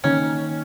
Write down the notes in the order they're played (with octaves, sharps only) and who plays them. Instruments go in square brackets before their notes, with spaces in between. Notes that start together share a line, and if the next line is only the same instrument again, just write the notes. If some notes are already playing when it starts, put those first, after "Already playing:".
[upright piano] D#3 A#3 D#4 [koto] C#4